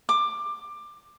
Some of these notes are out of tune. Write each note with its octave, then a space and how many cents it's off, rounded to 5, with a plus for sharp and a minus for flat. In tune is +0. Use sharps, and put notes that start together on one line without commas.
D6 +15